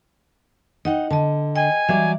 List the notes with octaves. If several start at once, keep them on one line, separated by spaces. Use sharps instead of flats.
D#4 D#5 F#5 G5
D3 D#5 A5
D#5 G5 G#5
E3 F#3 G3 D5 E5